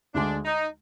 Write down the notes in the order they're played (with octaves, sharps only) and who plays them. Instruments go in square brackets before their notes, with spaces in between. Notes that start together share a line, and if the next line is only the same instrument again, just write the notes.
[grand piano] D2 D3 G#3 [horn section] D4
[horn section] D#4